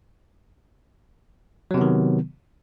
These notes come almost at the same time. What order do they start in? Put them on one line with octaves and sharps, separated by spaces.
F#3 C3 B3 D#3